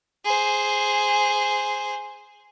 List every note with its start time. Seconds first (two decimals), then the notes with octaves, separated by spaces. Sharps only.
0.24 G#4 C5